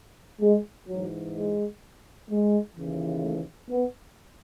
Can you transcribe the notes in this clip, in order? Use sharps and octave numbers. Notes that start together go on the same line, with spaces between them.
G#3
G#2 E3 F#3
G#3
G#3
D#2 C#3 E3
A3
B3